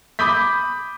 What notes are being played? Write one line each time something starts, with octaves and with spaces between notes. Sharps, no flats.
B5 D6 D#6 G6 B6